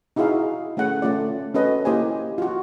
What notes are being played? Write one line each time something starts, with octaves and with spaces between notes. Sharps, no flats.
D#4 E4 F#4 G#4 E5 F5
A3 C#4 G#4 F#5
A3 C#4 F4 D5
C#4 F#4 A4 B4 D#5
A#3 E4 G4 C5 D#5 G#5
F4 F#4